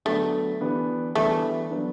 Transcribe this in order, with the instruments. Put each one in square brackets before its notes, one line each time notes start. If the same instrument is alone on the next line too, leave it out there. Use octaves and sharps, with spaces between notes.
[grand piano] D3 F#3 B3 D4 [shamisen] A3
[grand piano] E3 B3 D4 G4
[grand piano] E3 G3 B3 D4 G4 [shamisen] A3
[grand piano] F#3 B3 D4